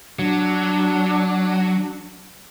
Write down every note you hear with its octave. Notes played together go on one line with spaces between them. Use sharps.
F#3 D4